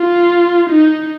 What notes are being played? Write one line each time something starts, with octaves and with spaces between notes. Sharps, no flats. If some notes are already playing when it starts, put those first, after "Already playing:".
Already playing: F4
D#4